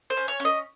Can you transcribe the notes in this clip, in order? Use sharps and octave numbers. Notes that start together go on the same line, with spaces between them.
C5
C#4
C#5
C#4
D#5